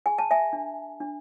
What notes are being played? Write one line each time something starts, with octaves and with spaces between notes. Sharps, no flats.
G#4 G#5
A5
E5 G#5
D4
D4